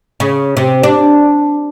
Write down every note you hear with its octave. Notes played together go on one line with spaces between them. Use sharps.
C#3
C3
D4